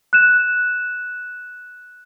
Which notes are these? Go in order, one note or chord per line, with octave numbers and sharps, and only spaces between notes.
F#6 E7